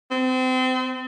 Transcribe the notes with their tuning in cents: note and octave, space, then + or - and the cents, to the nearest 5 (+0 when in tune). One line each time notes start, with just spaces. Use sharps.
C4 -30